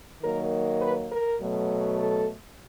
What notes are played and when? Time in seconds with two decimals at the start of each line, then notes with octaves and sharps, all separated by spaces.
0.23 D#3 F#3 A#3 A#4
0.82 B4
1.11 A#4
1.40 B2 F#3 A3
1.99 A4